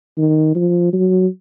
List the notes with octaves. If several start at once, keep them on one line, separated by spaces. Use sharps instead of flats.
D#3
F3
F#3